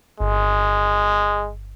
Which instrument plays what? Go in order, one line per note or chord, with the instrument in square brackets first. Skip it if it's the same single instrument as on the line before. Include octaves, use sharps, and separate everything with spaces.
[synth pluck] G1 [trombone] G#3